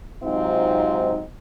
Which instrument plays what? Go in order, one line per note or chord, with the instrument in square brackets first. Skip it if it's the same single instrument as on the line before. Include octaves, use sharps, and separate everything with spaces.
[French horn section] G#2 C3 F#3 C4 D#4 F4